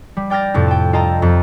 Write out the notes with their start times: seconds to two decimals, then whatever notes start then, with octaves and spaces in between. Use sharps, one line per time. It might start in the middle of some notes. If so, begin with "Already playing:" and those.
0.17 G3
0.30 D5 G5 F6 A6 A#6
0.54 F2 A2 C3
0.68 G5 A5
0.93 F4 A4 D#5 G5 A5 A#5
1.22 F2